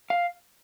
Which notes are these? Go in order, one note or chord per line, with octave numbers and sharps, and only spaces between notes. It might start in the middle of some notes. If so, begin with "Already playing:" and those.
F5